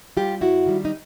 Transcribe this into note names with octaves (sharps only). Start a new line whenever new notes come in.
G3 F4 G4
F#2 E4 F#4
D#3 G3
D#4